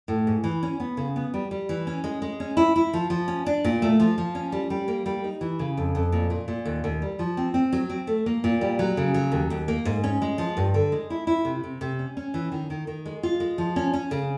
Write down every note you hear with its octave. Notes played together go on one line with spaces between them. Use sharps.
A2
G#2
E3
C#4
B3
C#3
B3
G3
G3
E3
C#4
G#3
G#3
C#4
E4
E4
F3
F3
C#4
D4
A#2
A3
F3
F3
C#4
G3
G3
A#3
G3
D#4
E3
C#3
F2
F2
A#2
A#2
A#2
D#2
D#2
G3
F3
C4
C4
F#3
C4
A3
A#3
A#2
G3
F#3
C#3
F#3
D#2
D#2
A#3
G#2
C#4
G#3
F3
G2
D3
G#3
E4
E4
C3
C3
C3
C#4
C#4
E3
D#3
D#3
D#3
G#3
F4
G#3
F3
C#4
C#4
C#3